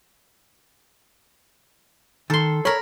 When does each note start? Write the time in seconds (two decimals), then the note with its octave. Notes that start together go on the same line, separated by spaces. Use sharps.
2.30 D#3 A4 C6
2.65 A#4 C#5 B5